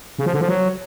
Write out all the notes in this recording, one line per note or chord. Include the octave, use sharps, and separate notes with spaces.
C#3
F3
D3
F3
F#3